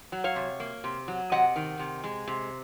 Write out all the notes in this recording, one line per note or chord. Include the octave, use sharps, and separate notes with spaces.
F#3
C#5 F5
C3
A#3
C3
F#3
C3 D#5 F#5
D#3
C3
G#3
C3